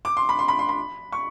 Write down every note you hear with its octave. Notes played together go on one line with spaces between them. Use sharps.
D6
C6
B5
C6
B5
C6
B5
C#6